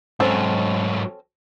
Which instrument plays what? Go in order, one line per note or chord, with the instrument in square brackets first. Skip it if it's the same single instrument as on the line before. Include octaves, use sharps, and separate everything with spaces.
[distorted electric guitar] G#2 F#3 [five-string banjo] C4 C#4 A4